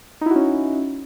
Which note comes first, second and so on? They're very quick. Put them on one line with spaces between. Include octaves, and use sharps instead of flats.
D#4 E4 F#4 C#4